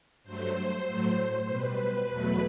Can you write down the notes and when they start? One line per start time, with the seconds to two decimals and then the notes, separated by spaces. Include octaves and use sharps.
0.23 G2 F#3 A3 C5
0.86 A2 F#3 A3
1.48 B2 G3 B4
2.10 E2 B2 F#3 A3